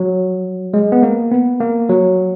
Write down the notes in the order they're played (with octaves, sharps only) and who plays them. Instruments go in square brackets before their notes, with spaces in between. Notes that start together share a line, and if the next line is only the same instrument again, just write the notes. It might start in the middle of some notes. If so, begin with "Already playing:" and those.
Already playing: [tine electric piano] F#3
G#3
B3
A#3
B3
A#3
F#3